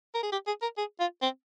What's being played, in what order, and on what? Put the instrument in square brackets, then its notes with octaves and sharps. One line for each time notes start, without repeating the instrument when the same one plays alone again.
[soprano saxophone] A#4
G#4
G4
G#4
A#4
G#4
F4
C4